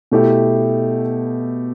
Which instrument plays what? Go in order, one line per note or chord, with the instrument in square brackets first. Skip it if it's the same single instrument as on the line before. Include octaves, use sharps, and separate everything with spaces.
[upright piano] B2 A3 E4 G4